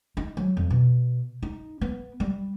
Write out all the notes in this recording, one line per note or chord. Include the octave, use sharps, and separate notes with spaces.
D#4
F#3
F2
B2
D#4
B3
G3